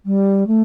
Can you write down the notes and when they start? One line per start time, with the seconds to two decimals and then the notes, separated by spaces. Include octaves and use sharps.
0.06 G3
0.47 A3